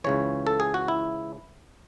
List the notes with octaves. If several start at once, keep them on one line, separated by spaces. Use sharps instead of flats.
C#2 C#3 E3 C#5
A4
G#4
F#4
E4